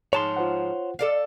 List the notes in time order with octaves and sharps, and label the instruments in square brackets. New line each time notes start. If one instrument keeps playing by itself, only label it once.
[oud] G#2 F3 [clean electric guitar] C#5 A5 C6
[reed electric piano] F4 C5 F#5
[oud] A4 D5 F5